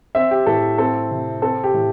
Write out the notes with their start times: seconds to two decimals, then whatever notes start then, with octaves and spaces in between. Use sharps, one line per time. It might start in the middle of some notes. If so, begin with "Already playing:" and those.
0.15 C4 E5
0.31 G4
0.46 A2 A4
0.78 C4 A4
1.11 C3
1.42 C4 A4
1.64 G4
1.74 A2